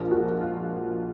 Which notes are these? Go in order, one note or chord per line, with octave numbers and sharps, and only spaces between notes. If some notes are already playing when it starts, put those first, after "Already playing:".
Already playing: A#1 A#2 F3 G#3 A#3 A#4
F#4
F4